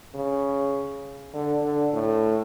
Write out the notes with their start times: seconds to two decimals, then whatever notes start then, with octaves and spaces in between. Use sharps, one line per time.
0.15 C#3
1.34 D3
1.63 D3
1.93 A2